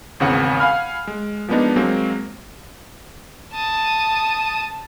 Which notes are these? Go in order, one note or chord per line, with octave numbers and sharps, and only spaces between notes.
G#1 E2 C#3 C4 F#5
F5 F#5 G#5 B5 F6
G#3
F3 G#3 A#3 B3 D4 D#4
F#3 G#3 A#3 C4
A5 D#6